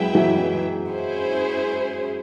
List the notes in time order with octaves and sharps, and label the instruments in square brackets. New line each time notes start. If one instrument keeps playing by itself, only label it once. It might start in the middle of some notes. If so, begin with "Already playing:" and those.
Already playing: [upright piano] F#3 G#3 [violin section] E4 G#4 B4 E5 G5
[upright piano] E3 F#3
[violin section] C#4 E4 G#4 C5